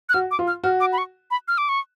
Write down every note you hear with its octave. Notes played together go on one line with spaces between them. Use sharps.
F#6
F#4 F6
D6
F4
F6
F#4 F6
D6
B5
C#6
B5
F6
D6
C#6